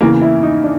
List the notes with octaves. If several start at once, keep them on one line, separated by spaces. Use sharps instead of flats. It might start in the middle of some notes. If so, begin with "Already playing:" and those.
E2 C#3 E3 A#3
E4
D#4
D4